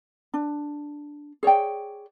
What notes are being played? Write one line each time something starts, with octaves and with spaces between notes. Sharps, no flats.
D4
G#4 C#5 D5 G5